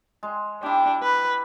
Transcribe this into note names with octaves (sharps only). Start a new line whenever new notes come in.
G#3
D4 E4 G4
B4